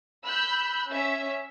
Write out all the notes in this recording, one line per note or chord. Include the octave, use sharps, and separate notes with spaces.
B5 E6 F#6 G6
C#4 E5